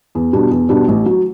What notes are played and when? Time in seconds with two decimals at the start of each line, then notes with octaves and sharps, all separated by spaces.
0.15 E2
0.33 B2 G3 D4
0.51 E2
0.69 B2 G3 D4
0.88 A1
1.06 F#3